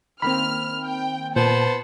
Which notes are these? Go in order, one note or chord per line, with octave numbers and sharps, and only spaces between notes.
D#3 A#3 C4 B5 F6
G5
A#2 B3 C5 A5